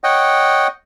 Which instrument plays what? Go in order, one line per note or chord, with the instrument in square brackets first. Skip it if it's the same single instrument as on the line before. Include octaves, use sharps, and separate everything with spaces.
[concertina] C#5 D#5 F#5 G5